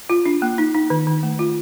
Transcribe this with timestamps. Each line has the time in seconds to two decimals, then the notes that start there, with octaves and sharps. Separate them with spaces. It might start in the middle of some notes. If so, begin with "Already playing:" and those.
0.10 F4
0.26 D4
0.42 A#3
0.58 D#4
0.75 D#4
0.90 D#3
1.07 D#3
1.23 A3
1.39 F4